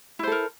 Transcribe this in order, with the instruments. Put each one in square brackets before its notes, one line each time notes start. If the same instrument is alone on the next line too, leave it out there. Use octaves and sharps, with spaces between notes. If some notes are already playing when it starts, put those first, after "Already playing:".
[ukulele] E4
C5
A4
A#4